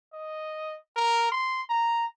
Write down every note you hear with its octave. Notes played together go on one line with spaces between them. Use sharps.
D#5
A#4
C6
A#5